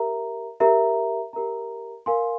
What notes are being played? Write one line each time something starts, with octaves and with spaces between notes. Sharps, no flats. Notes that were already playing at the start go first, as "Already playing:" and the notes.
Already playing: G4 A#4 E5 A#5
G4 A#4 E5 A#5
G4 A#4 E5 A#5
A#4 F5 G#5 C6